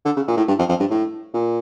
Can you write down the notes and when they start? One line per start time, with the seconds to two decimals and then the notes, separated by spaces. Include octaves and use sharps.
0.06 D3
0.17 C#3
0.28 A#2
0.37 A2
0.48 G2
0.59 F2
0.69 F2
0.80 G2
0.91 A2
1.34 A#2